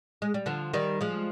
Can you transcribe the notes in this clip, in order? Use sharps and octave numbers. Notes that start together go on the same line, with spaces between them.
G#3
G3
D3 F3
D#3 G3
F3 G#3